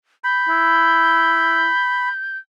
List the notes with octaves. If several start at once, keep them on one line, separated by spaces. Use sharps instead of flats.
B5 G6
E4